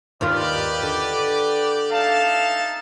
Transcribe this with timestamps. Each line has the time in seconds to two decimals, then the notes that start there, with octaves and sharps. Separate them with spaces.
0.21 D#2 D#3 F4 G4 B4 D5
0.83 D3
1.91 D#4 E5 F5 A5